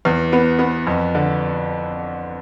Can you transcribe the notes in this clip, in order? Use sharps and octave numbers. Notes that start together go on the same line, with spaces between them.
E2
B3
B3
F2
D3